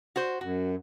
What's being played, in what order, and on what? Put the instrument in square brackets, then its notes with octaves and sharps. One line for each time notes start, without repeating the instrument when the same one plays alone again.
[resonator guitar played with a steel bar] F#4 C5
[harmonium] F#2 [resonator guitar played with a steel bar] F#4